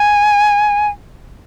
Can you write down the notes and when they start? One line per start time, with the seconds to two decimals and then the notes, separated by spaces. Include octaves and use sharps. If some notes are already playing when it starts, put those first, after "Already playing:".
Already playing: G#5